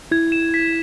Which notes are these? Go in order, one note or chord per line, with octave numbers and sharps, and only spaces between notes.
E4 G#6
E7
B6